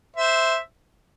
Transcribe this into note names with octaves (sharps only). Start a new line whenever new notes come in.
C5 E5